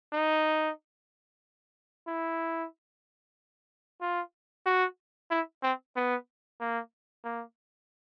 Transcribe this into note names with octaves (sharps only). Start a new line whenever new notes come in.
D#4
E4
F4
F#4
E4
C4
B3
A#3
A#3